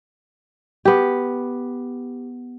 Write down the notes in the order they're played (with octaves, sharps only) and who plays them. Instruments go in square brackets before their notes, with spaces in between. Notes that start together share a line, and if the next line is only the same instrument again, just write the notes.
[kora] B3 G4